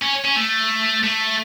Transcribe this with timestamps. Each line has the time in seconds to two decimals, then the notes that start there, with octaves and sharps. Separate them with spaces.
0.02 C#4
0.24 C#4
0.35 A3
1.04 A3